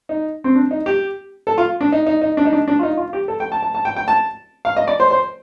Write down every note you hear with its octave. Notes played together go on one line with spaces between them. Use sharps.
D#4
C4
D4
D#4
G4
A4
F4
D4
D#4
D#4
D#4
D4
D#4
D4
D4
F4
D#4
F4
G4
A4
G5
A5
A5
A5
G5
G5
A5
F5
D#5
D5
C5
C5